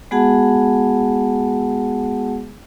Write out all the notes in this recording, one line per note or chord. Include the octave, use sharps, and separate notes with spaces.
G#3 B3 F#4 G#4 F#5 A5